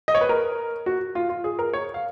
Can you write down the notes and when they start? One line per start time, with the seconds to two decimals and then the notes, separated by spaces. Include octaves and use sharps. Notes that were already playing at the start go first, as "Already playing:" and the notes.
0.08 D#5
0.15 C#5
0.21 B4
0.29 A#4
0.86 F#4
1.15 F4
1.29 F4
1.44 G#4
1.59 A#4
1.73 C#5
1.94 F5